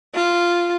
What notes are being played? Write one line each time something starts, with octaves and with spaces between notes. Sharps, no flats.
F4